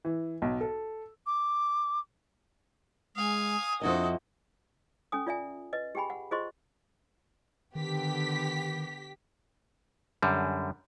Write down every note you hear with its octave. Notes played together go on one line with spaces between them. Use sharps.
E3
B1
A4
D6
G#3 F5 G#5 D#6
F2 D4 E4 F#4 A4 D#5
C#4 A4 G#5 D#6
F4 D5 E5 G#5
B4 D#5
G4 G#4 G5 G#5 B5
F#5
F4 G#4 C5 D#5 C6 C#6
D3 D#3 B3 G4 B6
F#2 D3 G3